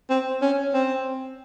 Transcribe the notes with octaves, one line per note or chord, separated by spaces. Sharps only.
C4
C#4
C4